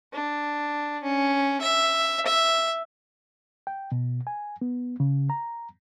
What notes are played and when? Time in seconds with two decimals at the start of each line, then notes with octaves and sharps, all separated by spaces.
0.13 D4
1.03 C#4
1.61 E5
2.26 E5
3.67 G5
3.92 B2
4.27 G#5
4.62 B3
5.00 C#3
5.30 A#5